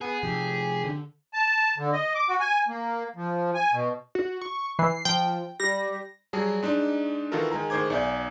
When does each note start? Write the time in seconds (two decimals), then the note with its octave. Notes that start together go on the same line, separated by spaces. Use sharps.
0.01 B3 G#4 B4
0.23 C3 F3 G4
0.85 D3
1.34 A5
1.78 D3
1.93 D#5
2.15 D6
2.29 F#4
2.40 G#5
2.68 A#3
3.16 F3
3.55 G#5
3.73 B2
4.15 F#4
4.41 C#6
4.79 E3 C7
5.05 F3 G5
5.60 G3 A#6
6.33 F#3 G3 G#4 A5
6.63 G#3 D4 D#4
7.32 D#3 E3 F4 F#4 A4 A#4
7.51 D#3 G#3 G#5 A#5
7.70 A2 D#3 G#4 C5 D6 G#6
7.90 B1 D5 E5 G#5 G6